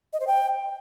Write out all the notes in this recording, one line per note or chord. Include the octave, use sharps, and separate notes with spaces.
D#5
C5
G5